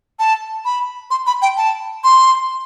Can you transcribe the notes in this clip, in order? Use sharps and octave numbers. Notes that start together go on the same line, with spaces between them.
A5
B5
C6
B5
G5
A5
C6